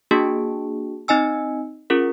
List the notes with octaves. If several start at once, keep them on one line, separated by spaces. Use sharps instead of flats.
A#3 D4 F#4 G#4 A5
C4 D#4 D#5 G#5 E6
C#4 F4 G#4 A#4